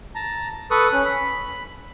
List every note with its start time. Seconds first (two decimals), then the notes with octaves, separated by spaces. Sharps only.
0.15 A5 A#5
0.71 A4 B4 C#6 D#6 F#6
0.93 C#4 F#6
1.06 B5